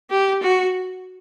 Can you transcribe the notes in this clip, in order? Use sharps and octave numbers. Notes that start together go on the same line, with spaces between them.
G4
F#4